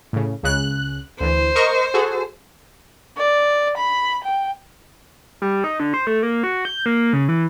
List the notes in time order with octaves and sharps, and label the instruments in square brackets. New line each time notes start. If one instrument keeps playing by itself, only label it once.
[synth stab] A2 C#3
C#2 C#3 F#6
[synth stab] D2 E3 [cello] C5
[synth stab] A#4 D#5 C#6
F#4 G#4 A4
[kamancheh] D5
B5
G5
[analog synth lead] G3
D#4
D3
C5
A3
A#3
F#4
G6
A#3
C#3
E3